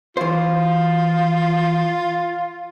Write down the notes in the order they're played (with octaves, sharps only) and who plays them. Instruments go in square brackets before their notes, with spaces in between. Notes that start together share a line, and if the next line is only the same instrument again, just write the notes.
[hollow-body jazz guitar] E3 C5 [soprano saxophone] F4